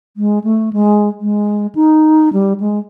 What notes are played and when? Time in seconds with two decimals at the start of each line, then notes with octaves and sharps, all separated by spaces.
0.17 G#3
0.44 A3
0.73 G#3
1.21 G#3
1.75 D#4
2.33 G3
2.60 G#3